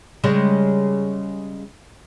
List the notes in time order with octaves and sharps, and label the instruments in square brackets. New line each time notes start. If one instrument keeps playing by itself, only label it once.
[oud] C#3 G3 G#3